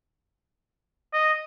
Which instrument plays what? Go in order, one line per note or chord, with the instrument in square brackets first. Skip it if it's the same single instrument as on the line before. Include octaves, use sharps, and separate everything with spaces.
[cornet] D#5